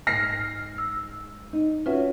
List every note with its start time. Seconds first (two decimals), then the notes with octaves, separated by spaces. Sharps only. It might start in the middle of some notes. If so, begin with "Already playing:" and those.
0.07 G#2 F6 A#6 C7
0.78 E6
1.53 D#4
1.86 C#4 F4 F#4 B4 E5